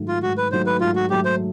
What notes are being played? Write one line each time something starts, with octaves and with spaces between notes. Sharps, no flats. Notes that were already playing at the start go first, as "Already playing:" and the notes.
Already playing: G#2 D#3 F#3 A3
F4
G#2 F#4
B4
D#3 F#3 A3 C5
B4
G#2 F4
F#4
D#3 F#3 A3 G4
C5